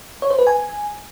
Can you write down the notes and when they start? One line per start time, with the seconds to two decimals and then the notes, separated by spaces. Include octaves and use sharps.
0.22 C#5
0.30 C5
0.39 B4
0.47 G#5